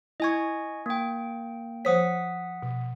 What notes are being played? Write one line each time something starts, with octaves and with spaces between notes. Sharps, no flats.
E4 D#5 G#5 C#6 G#6
A#3 G5
F3 C5 C#5 F#5 D#6 B6
B2